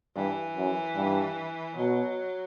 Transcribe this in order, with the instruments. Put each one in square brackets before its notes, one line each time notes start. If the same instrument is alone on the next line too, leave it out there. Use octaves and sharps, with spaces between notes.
[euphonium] G2 [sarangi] E3
[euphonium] F#2
G2
[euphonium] B2 [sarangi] F#3